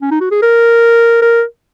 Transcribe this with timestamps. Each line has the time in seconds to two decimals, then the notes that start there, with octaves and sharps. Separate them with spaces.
0.02 C#4
0.11 D#4
0.21 F#4
0.31 G#4
0.42 A#4
1.22 A#4